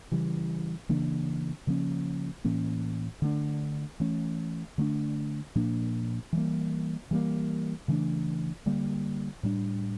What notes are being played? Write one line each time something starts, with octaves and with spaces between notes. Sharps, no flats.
C#3 E3 G3
C#3 E3 A#3 D4
C#3 F3 A#3 C#4
A2 E3 A#3 C#4
D3 A3 D4
E3 A3 C#4
D3 A3 D4
A#2 F3 A#3 D4
E3 G3 A#3
E3 G3 A#3
C#3 E3 A3 D4
D3 G3 A#3
A2 G3 D4